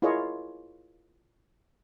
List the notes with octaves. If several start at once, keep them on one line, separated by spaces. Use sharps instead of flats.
E4 F4 G#4 A#4 C#5 D#5